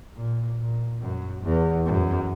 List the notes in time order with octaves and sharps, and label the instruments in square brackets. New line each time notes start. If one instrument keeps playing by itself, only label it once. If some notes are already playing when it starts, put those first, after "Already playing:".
[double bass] A#2
A#2
F#2
E2
F#2